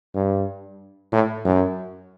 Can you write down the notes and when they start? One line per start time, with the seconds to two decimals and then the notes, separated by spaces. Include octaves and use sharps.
0.15 G2
1.12 A2
1.45 F#2